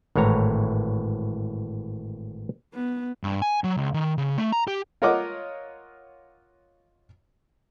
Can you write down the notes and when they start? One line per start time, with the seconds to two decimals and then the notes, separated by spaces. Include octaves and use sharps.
0.15 G#1 A2 E3 C#5 A#5
2.74 B3
3.24 G2
3.42 G#5
3.64 F#3
3.77 C#2
3.94 D#3
4.18 C#3
4.37 A3
4.52 A#5
4.68 G4
5.02 F4 A#4 C#5 D#5 F#5 D6